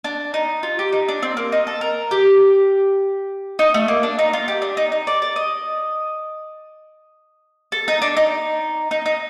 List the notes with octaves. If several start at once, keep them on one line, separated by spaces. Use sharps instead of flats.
D4
D#4
F4
G4
D#4
D4
C4
A#3
D#4
A4
A#4
G4
D#4
A3
A#3
D4
D#4
F4
G4
D4
D#4
D#4
D5
D5
D#5
A4
D#4
D4
D#4
D#4
D#4